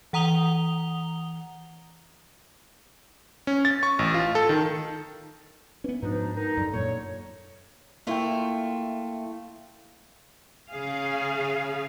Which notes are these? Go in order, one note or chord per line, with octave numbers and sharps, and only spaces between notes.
E3 F#5 A#5 D#6 F7 G7
C#4
A6
C#6
A1
F4
A4
D#3
E3 B3 C#4
G#2 B2 F3 D4 D#4
D#3 D#4
F#2 D3
F#2 A#2 C#5
A3 A#3 E4 F4 G5
C#3 G#4 F5